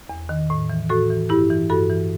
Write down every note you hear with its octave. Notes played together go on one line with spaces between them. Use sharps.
E2
D#3
A2
E3
A2 F#4 A4
E3
G2 E4 G4
E3
G2 F#4 A4
E3